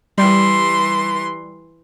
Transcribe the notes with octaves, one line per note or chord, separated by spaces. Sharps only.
E3 G3 C6